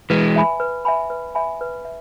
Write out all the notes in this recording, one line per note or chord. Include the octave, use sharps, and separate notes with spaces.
E3 G#3 B4
E5 G#5 B5
B4
E5 G#5 B5
B4
E5 G#5 B5
B4
E5